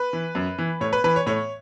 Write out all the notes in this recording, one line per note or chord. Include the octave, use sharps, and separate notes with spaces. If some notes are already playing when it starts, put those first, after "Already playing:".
Already playing: B4
E3
F#2
E3
A2 C#5
B4
E3 B4
C#5
A2 C#5